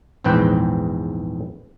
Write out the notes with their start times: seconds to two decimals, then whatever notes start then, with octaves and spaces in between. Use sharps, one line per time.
0.24 A#1 E2 G#2 C4 B4 G5